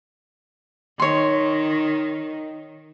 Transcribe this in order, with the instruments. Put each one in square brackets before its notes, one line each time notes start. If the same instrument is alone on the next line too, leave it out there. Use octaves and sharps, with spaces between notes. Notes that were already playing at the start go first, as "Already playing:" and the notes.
[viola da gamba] D#3 [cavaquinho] C#5 C6